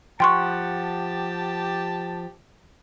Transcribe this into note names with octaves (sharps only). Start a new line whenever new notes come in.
F3 G4 F#5 G5 A5 C6 C#6